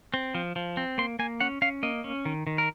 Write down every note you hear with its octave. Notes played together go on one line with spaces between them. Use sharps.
C4
F3
F3
C4
A#3 C6
A#3 G#5
C#4 F#5
C#4 F5
A#3 D#5
C#4
D#3
D#3
A#4